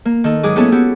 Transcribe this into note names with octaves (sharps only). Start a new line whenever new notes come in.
A#3
D#3 A4
G#2 F#3 G#4 D6 D#6
A#3 B3 C#4 E4 G#4 A4
B3 C#4 E4 F#4 G4